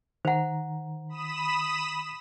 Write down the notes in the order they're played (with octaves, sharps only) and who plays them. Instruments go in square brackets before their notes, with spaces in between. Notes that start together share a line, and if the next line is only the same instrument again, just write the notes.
[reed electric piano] D#3 A#5 [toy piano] C5 F#5
[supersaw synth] B5 D#6 E7